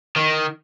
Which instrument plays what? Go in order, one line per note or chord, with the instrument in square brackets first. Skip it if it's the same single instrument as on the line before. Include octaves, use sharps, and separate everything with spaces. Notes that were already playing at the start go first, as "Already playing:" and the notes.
[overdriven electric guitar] D#3